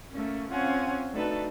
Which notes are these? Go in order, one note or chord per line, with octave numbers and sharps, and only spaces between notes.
A3 A#3 C#4
C4 C#4 F4 C#5 F#5 G#5
A3 D4 D#4 F#4 A4 B4